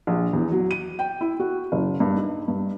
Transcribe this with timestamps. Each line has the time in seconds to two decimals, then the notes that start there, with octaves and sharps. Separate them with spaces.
0.07 A#1
0.33 E2
0.52 F#3
0.71 D#7
0.99 G5
1.21 E4
1.40 F#4
1.72 F#1
2.00 G2
2.17 D#4
2.48 G2